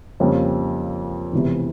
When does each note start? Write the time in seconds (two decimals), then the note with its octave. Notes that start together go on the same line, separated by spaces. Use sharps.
0.20 F2 C#3 G3 A#3 C#4
1.32 E1 E2 C3 E3